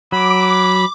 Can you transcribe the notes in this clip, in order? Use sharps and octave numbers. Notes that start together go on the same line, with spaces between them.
F#3 B5 D6